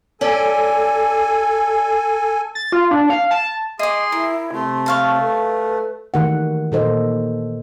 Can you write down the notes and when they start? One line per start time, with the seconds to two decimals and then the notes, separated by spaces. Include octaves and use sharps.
0.21 C#4 G4 A4 D5 G#5
2.55 A6
2.72 F4
2.91 D4
3.10 F5
3.31 A5
3.79 G#4 D#5 C6 D6
4.12 E4 A#4
4.53 C3 A3 C6
4.86 C#5 F5 A5
5.22 A4 B4
6.14 D#3 E3 A3 G4 F#5
6.72 A#2 D#4 A4 A#4 C5 D#5